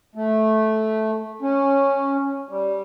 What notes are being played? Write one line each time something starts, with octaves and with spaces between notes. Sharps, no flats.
A3
C#4
G3